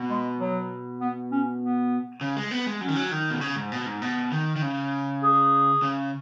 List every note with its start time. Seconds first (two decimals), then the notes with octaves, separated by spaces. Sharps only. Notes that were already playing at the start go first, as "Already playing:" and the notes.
Already playing: B2
0.10 G#3
0.40 F#3
1.01 B3
1.31 C#4
1.61 B3
2.21 C#3
2.37 G#3
2.51 B3
2.67 G#3
2.81 F#3 C#4
2.89 D#3
2.96 F#3
3.11 D#3
3.30 B2
3.41 C#3
3.56 G#2
3.72 B2
3.86 G#2
4.02 B2
4.32 D#3
4.56 D#3
4.62 C#3
5.23 G#4
5.82 C#3